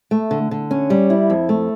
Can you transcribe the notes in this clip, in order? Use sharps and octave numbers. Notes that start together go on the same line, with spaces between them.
A3
D3
D3
C#4
G3
E4
F2
A3